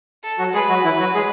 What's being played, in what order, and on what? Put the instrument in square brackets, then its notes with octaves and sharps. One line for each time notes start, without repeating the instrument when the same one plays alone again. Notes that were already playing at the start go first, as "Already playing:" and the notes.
[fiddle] A4
[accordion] F#3 F#4
[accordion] G#3 G#4 [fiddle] B4
[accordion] F#3 F#4
E3 E4
F#3 F#4
G#3 G#4